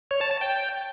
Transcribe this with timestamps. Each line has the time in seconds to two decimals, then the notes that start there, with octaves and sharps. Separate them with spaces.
0.11 C#5
0.21 A5
0.31 A5
0.41 G5